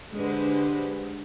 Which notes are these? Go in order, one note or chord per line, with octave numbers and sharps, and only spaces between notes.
D3 G#3 G4 B4 C5